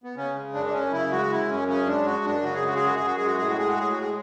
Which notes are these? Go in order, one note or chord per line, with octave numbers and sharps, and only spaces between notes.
B3
C#3 C#4
G#3
F#2 D4
D4
F#2 C#4
C#3 E4
G#3 F#4
F#2 E4
F#2 C#4
C#3 C#4
G#3 D4
F#2 F#4
F#2 D4
C#3 F#4
G#4
G#3 F#4
G#4
F#2 F#4
F#2 G#4
F#4
G#3 G#4
F#4
A2 G#4
F#4
G#3 G#4
F#4
A2 G#4
F#4
G#3 G#4